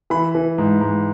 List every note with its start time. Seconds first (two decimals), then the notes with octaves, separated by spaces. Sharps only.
0.10 E3 B5
0.35 E3
0.58 G#2
0.81 G#2